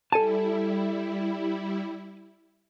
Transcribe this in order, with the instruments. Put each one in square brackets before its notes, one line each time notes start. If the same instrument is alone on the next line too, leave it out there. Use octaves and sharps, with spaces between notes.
[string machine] G3 E4 [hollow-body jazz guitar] A4 G#5 A5